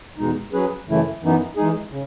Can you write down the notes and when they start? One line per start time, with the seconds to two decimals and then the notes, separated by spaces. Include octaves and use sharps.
0.18 E2 B2 G#3 D#4
0.53 F#3 C#4 G#4 B4
0.87 F#2 C#3 E3 A3 E4
1.22 F#2 E3 B3 D#4
1.57 E3 G#3 D#4 G#4
1.91 C#3